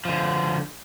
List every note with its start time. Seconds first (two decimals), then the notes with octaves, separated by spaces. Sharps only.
0.05 D3 F3